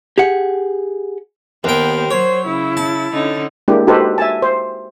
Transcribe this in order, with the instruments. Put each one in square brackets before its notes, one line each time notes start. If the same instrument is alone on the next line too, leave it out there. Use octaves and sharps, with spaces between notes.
[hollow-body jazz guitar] G4 G#4 F#5
[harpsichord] D#2 G5 [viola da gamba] B3 A#4 C5
[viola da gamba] F#3 [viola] C5 [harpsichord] C#5
[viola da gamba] C#3 [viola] E4
[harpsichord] A5
[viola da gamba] D3 C#4 D#4
[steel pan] G#3 A#3 D4 E4 G4
D#4 F#4 G4 A4 B4 C5
E5 G#5 A5
C5